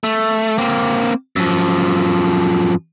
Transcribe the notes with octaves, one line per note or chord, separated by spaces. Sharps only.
A3
A#3 C4
F#2 F3